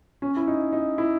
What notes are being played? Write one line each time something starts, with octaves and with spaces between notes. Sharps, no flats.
C#4
E4
D#4
D#4
E4